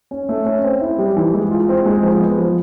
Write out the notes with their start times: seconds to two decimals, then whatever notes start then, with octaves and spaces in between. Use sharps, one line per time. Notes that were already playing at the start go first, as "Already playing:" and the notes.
0.11 C#4
0.29 A3
0.46 C#4
0.64 C4
0.81 E4
0.98 G3
1.17 E3
1.33 G#3
1.51 F4
1.69 C4
1.86 G#3
2.03 F3
2.21 B3
2.38 F3